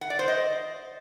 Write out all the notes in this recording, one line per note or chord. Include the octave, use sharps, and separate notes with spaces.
F#5
D5
C5
D#5